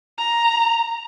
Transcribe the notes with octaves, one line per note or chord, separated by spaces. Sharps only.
A#5